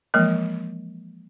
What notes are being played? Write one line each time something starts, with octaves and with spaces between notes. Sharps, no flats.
E3 F3 G#3 A#3 A#4